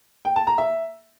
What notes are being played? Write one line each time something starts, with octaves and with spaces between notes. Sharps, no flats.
G5
A5
A#5
E5